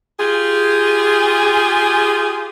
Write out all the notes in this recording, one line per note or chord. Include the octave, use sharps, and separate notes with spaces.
F4 G4 G#4